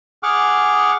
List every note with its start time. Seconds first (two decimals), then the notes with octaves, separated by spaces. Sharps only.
0.23 G#4 F#5 C#6 D6 F6